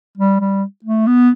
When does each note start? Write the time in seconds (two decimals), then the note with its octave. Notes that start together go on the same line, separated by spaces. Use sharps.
0.17 G3
0.40 G3
0.85 A3
1.07 B3